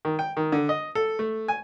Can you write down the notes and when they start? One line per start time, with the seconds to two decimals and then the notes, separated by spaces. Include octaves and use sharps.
0.05 D#3
0.19 G5
0.37 D#3
0.52 D3
0.69 D#5
0.95 A4
1.19 A3
1.48 G#5